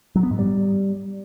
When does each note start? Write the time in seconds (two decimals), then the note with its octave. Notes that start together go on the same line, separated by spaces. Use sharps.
0.15 F#3
0.23 B3
0.31 G#2
0.39 G3